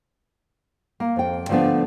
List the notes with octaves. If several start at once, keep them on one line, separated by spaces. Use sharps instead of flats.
A#3
F2 G5
D3 F3 A3 B3 D4